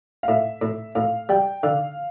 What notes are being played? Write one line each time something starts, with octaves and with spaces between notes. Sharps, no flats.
F5
A2 E5
A2
A2 F5
G3 G5
D3 F5